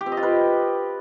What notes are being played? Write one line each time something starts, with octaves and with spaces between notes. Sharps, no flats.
G4
C4
D#5
F4
B4